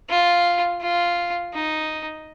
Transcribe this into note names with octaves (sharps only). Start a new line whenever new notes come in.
F4
F4
D#4